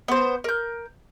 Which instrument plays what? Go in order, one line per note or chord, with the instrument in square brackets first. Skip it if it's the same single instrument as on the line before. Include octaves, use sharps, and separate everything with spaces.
[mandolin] B3 C5
A#4 G6